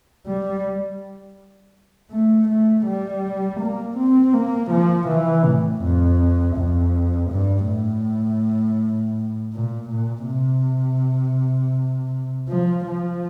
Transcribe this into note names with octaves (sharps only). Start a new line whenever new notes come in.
G3
A3
A3
G3
A#3
C4
A#3
F3
E3
A2
F2
F2
G2
A2
A#2
A#2
C3
F3
F3